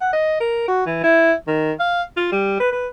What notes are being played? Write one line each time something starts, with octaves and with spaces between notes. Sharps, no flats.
F#5
D#5
A#4
F#4
E3
E4
D#3
F5
F4
G3
B4
B4